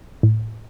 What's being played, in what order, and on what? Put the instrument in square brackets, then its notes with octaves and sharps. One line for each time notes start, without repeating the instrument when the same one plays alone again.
[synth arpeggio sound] A2